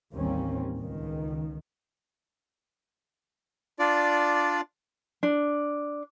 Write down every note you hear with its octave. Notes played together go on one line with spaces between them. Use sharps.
A1 D#2 G3 A#3 C4 C#4
C#2 D#3
D4 F4 D5
D4